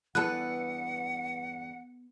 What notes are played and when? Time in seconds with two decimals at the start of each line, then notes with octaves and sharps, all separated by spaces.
0.15 E2 G2 B3 A4 B4 F#5 F#6